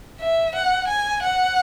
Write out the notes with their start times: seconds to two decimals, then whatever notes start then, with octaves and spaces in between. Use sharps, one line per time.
0.20 E5
0.55 F#5
0.88 G#5
1.23 F#5